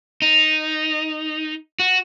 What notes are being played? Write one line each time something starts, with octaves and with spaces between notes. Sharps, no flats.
D#4
F#4